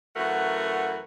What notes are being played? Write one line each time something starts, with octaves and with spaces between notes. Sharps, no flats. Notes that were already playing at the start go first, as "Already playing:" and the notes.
F#2 E3 A3 F#4 A#4 F#5